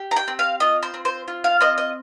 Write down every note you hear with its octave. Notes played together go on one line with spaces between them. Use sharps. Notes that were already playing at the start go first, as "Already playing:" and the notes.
Already playing: G4
A#5
G5
C4
F5
F4 D#5
C5
C4
C5
F4
F5
C4 D#5
D#5